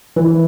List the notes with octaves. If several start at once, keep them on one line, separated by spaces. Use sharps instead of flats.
E3